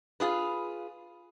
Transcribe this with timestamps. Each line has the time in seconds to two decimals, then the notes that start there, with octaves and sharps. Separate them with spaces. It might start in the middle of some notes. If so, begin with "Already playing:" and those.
0.20 F4 G#4 B4